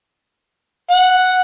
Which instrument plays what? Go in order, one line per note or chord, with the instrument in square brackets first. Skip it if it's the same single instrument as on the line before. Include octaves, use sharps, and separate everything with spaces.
[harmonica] F#5